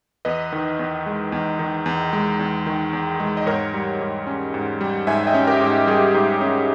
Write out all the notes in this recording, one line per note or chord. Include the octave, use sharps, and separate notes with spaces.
E2 B4 D#5
D#3
E2
G#3
E2
D#3
E2
G#3
E2
D#3
E2
G#3
D#5
G#2 A#4 C#5
G3
G#2
C#4
G#2
G3
G#2 E5 G#5
D#5 G5
C#4
G4 A#4
G#2
G4
G3 G#4
G#2
C#4